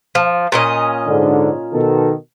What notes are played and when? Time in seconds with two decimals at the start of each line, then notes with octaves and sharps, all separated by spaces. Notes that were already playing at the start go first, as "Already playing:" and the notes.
0.15 F3
0.52 A#2 C#4 D#5
1.07 G#2 D3
1.73 B2 D#3 A4